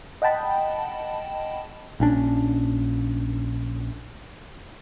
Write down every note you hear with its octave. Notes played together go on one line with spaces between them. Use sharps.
D#5 F#5 G5 A5 B5
A#1 C#4 D4